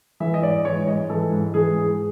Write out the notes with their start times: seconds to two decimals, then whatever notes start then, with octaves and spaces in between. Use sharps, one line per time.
0.20 E3 E5
0.34 D#5
0.42 G#2 D5
0.65 E3 C#5
0.87 G#2 D#5
1.10 E3 A4
1.32 G#2
1.54 E3 G#4
1.77 G#2